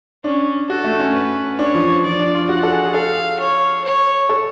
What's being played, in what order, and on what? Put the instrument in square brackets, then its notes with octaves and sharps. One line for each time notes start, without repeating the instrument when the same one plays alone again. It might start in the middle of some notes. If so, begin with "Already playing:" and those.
[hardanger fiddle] C#4 [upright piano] D4
[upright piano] F#4 [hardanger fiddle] A4
[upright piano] A3
C#4
[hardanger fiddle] B4
[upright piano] D4 [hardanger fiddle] C#5
[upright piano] F3
[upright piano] F3 [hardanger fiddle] D5
[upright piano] D4
F4
[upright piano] F#4 [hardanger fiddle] F#5
[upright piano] A4
G#4
G#4
[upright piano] A4 [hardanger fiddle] F5
[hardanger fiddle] C#5
C#5
[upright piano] A4